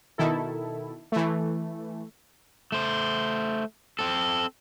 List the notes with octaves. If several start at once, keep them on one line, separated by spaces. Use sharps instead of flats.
B2 D#3 E4 A4
E3 A3
A3 C5
C4 A4